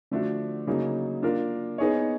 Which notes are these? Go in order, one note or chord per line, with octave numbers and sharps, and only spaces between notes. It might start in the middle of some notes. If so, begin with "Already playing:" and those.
D3 F3 A3 D4 F#4
C#3 F#3 A#3 D#4
A#3 D4 F4 A#4
B3 D#4 G#4 C#5